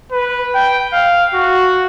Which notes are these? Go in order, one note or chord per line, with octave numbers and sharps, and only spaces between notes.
B4
G5
F5
F#4